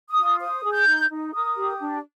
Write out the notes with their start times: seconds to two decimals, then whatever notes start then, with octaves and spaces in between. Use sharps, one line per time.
0.09 D#6
0.17 F4
0.41 C5 D#6
0.64 G#4
0.72 G6
0.87 D#4
1.10 D#4
1.34 A#4 D#6
1.57 G4
1.80 D4